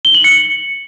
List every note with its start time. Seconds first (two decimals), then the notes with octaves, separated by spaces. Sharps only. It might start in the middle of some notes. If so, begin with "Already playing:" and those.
0.05 G7
0.15 F#7
0.24 C#7